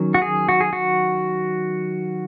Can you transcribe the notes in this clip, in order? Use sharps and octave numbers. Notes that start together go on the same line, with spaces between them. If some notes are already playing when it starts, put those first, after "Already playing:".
Already playing: D#3 F#3 C#4
F#4
G#4
F#4
G#4
F#4